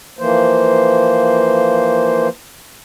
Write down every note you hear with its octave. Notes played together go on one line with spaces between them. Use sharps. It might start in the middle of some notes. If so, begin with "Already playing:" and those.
E3 F3 A#3 C5